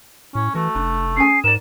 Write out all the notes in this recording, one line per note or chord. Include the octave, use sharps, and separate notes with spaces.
A2 C#4
E3 A3 F#4
F1 D4
C#4 G#4 G#5 C7
G#2 A#4 D5 E7